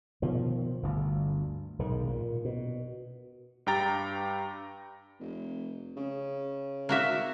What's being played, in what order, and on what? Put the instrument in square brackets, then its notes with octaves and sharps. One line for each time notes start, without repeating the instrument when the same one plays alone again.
[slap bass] B2 D#3 F3
G1 D2
B1 G#2 D#3
A#2
B2
[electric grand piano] G2 G4 G5 A#5 A6
[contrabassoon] F1
C#3
[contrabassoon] G#1 [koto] A#3 F#4 E5